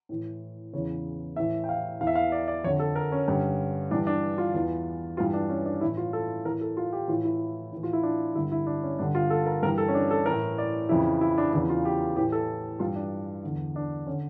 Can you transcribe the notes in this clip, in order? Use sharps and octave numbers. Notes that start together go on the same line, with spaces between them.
A2 E3
E2 C#3 E3 C#5
A2 E3 E5
G5
F5
E2 E3 F5
E5
F5
D5
D5
F2 D3 C#5
A4
A#4
C#4
G2 D3
G2 E3 D4
D4
F4
E2 E3
G2 E3 F4
D4
C#4
D4
A2 E3 E4
F4
A4
A2 E3 A#4
A4
F4
G4
A2 E3 F4
E4
A2 E3
F4
E4
D4
G2 D3 E4
E4
D4
C#4
G2 D3 D4
F4
A4
A#4
G2 E3 A#4
A4
C#4
D4
A4
A2 E3 A#4
D5
F2 C#3 E3 E4
E4
D4
E2 C#3 E3 D4
F4
G4
A2 E3 G4
A4
G2 E3 F4
D4
E2 D3
D4
D3 C#4